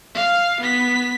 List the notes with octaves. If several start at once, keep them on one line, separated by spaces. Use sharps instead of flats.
F5
B3 B6